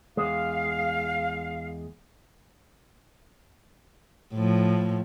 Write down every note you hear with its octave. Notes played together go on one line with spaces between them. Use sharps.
E2 G#3 F5
A2 F3